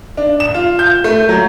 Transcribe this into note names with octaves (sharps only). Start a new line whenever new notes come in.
D4
E7
F4
G6
A3
F#3